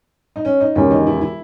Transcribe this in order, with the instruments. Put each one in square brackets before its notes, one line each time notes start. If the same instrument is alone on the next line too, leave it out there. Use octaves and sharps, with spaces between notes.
[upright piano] D#4
C#4
D#4
[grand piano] E1 D#2 C#3 E3 [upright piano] C#4
[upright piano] D#4
E4
E4